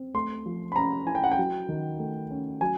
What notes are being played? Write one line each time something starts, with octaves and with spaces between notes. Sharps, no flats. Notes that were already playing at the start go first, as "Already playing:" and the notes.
Already playing: C4
A3 C6
F3
B5
C#4 A#5
E4 G#5
G5
F#5
G5
F#3
D#3
A3
C#4
F#3 G#5